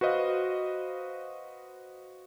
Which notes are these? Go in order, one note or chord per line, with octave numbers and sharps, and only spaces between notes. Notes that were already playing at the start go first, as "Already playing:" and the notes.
F#4 B4 C5 D#5 F5